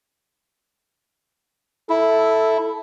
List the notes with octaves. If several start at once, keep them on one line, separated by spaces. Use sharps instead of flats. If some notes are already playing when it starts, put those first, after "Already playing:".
E4 A4